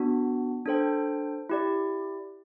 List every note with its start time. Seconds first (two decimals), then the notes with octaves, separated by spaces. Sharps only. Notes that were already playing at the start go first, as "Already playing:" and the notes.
Already playing: B3 D4 F#4
0.66 D4 A4 C5 G5
1.49 E4 G4 D5